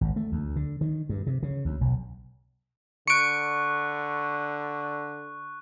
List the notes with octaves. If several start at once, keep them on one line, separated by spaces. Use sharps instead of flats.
G#1
A3
D2
D3
D#3
G2
C3
C#3
D2
B1
D3 C#6 F#6 C#7 D7